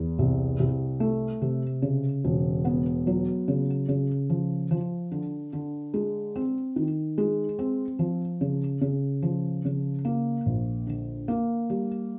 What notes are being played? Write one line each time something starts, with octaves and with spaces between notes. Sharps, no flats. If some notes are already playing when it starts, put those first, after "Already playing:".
Already playing: E2
C2
C2
A3
C3
C#3
E1
B3
F#3
C#3
C#3
F3
F3
D3
D3
G#3
C4
D#3
G#3
C4
F3
C#3
C#3
F3
C#3
A#3
A#1
D3
A#3
G3